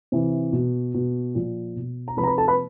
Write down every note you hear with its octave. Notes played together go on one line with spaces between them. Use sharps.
C3 E3
B2
B2
A#2 F3
B2
A#5
C3 F3 B4 B5
A#5
B4 B5
A4 A5
B4 B5